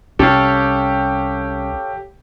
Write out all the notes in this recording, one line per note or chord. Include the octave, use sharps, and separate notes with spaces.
C2 C#4 G4 A4 C#5 F5